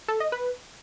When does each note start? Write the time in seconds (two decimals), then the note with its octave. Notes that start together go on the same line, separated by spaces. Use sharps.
0.08 A4
0.20 D#5
0.32 B4